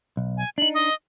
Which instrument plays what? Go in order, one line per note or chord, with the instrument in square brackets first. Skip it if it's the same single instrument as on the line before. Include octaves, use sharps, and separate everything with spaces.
[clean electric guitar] B1
[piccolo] G#5
[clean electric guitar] D4 D#4 [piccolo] F#7
[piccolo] D#5